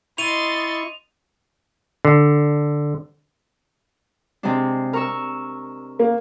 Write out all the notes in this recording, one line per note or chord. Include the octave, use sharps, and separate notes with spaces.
E4 D#5 C6 C#6 A6 D#7 F7
D3
C3 G#3 D4
A#4 C#6 E6
A#3